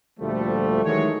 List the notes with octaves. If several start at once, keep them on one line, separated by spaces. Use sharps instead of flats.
D2 A#2 F3 G3 A3
D#3 E3 F#3 G#3 A3 C#5